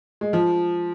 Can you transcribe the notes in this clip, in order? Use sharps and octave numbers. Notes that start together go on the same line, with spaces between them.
G#3
F3